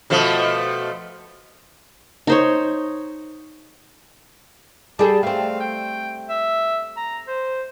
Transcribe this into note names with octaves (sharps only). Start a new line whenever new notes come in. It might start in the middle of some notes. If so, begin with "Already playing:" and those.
B2 F3 A3
D#4 C5 C#5
G3 G#4 A4 A5
A3 C4 F5
G5
E5
A#5
C5